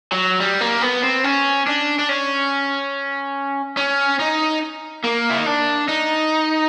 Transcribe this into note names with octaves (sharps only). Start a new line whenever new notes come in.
F#3
G3
A#3
B3
C4
C#4
D4
D4
C#4
C#4
D#4
A#3
E4
D#4
D4
D#4